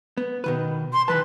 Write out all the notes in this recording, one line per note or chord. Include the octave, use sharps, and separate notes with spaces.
B3
B2 D#3 B4
C6
D#3 E3 B4 A5